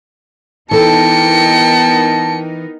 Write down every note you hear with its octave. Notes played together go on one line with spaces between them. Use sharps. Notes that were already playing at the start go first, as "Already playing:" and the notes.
E3 B3 D#4 A4 A#4 G5 A5 C#7